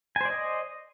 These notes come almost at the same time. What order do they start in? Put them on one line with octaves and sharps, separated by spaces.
G#5 C5 D5 D#5